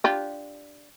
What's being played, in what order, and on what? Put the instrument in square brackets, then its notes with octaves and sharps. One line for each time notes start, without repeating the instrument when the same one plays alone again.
[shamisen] D4 F4 G4